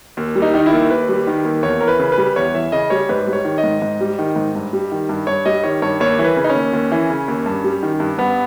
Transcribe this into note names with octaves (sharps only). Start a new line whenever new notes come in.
D#2
G3
D#4
D#3 D#4
E4
D#2
D#2 B4
G3
D#3
D#2
E2 C#5
E3 A#4
B4
C#3
B4
G3
E2 C#5
E3 E5
C#3 D#5
G3 C#5
G#2 B4
G3
C#5
D#3
D#5
G#2
G#2
G3
D#3
G#2
G2
G3
D#3
G2
G2 C#5
G3 D#5
D#3 C#5
G2 C#5
D#2 C#5
E3
B4
C#3
D#4
C#4
D#2
D#2
E3
C#3
D#2
G2
G3
D#3
G2
G2 B3